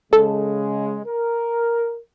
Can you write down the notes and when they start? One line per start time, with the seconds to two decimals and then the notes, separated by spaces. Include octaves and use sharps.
0.13 C#3 G#3 A4
1.06 A#4